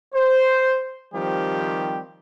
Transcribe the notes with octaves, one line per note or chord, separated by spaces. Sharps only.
C5
D#3 F3 G3 C4 G4